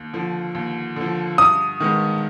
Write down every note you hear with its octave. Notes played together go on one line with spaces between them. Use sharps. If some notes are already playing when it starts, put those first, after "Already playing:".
Already playing: D#2
D3 F3
D#2
D3 F3
G2 D#6
D#3 G#3 B3